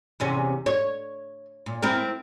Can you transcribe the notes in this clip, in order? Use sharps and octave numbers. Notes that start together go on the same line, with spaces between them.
E2 C3 C#4
C#5
A#2
C4 E4 A#4